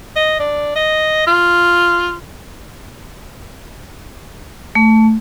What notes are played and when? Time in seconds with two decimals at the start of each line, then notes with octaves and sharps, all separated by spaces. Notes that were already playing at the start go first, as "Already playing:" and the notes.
0.16 D#5
0.39 D4
0.76 D#5
1.27 F4
4.75 A3